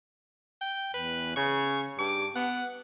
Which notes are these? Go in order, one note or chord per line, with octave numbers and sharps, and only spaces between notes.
G5
E2 B4
C#3 C#6
G2 D6
B3 F#5